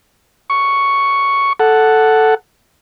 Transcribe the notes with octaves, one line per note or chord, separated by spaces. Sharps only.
C#6
A4 F#5